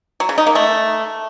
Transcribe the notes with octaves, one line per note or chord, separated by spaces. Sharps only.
F#3
C#3
D#4
A#3
A3